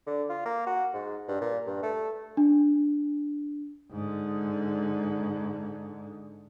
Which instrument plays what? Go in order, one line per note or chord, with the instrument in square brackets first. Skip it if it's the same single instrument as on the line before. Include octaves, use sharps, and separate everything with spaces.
[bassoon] D3
F4
A#3
F#4
G#2
G2
A#2
G2
A3
[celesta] D4
[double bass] G#2 D3